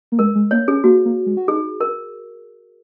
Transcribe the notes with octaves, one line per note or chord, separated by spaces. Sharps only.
A#3
G#3 A#4
G#3
A#3 C#5
C#4 G#4
A#3 F#4
A#3
G#3
F#4
D#4 G#4
A#4